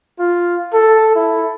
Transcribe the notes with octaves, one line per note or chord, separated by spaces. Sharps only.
F4
A4
E4